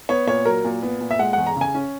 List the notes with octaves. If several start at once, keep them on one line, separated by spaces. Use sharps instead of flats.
B3 C#5
A#2 C#5
F#3 A#4
A#2
B3
A#2
E5
G#3 F#5
E2 F#5
A#5
C#3
G#5
C#4